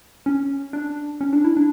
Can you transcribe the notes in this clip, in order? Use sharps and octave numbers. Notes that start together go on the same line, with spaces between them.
C#4
D4
C#4
D4
E4
D4